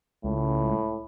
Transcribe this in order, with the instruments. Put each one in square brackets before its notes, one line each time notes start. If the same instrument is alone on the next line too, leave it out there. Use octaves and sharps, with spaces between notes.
[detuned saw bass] C#2 [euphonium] A2